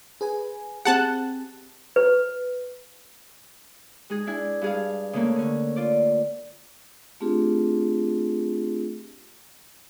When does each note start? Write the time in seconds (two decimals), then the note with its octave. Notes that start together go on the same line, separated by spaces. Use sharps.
0.21 G#4 B4 G#5
0.85 C4 G4 G#4 F#5 A5 F#6
1.96 B4
4.10 G#3 D#4 G#4
4.27 D4 E4 G#5
4.62 G2 G#4 F5
5.13 C#3 E3 A3 A#3 C#4
5.36 D3 C#4
5.76 F4 D5
7.20 A3 C4 D4 F4 G4 G#4